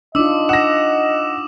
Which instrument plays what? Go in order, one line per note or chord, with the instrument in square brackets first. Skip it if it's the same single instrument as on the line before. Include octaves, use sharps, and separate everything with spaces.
[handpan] D4 D#4 F4 [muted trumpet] D#5 [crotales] D6 E6
[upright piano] F#5 A#6 [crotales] D#6 E7